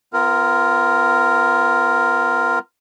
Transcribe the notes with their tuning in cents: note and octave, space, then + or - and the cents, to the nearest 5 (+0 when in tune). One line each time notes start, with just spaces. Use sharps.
B3 +30 F4 -20 A#4 +0